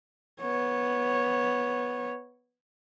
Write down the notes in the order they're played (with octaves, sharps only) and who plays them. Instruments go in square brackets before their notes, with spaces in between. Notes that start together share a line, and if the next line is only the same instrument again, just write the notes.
[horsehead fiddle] B3 C#5